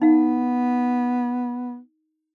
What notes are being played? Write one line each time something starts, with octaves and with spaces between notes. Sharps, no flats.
B3 D#4 F5